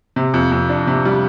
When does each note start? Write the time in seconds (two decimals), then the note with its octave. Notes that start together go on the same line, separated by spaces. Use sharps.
0.16 C3
0.34 F2
0.51 F2
0.69 D4
0.87 C3
1.05 G3